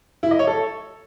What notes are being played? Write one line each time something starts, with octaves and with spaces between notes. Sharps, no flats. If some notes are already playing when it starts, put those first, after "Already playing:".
E4
D#5
C#5
A4